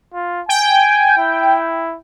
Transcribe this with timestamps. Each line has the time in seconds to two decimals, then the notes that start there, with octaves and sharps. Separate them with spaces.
0.14 F4
0.49 G5 G#5
1.18 E4